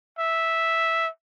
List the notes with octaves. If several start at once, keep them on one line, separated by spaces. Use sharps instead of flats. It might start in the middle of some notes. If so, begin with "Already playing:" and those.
E5